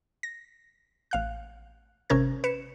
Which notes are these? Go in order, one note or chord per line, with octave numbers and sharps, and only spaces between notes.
A#6
A1 F5 F#6
G#1 C3 C#4 A#4 G#6
B4 C#7 E7